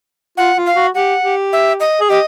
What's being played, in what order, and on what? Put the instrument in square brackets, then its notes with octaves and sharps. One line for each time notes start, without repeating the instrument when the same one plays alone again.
[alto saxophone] F4 [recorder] F#5
[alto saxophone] F4
[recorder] F5
[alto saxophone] F#4
[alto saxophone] G4 [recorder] F#5
[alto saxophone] G4
[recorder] E5
D#5
[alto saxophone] G#4
[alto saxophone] G4 [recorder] D#5